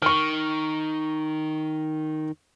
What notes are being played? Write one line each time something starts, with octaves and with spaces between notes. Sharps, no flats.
D#3 C#6 F6